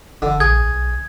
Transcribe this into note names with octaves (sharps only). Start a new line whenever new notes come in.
F#1 D3
A#1 G#4 G#6
B1